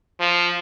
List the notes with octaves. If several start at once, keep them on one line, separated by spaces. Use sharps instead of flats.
F3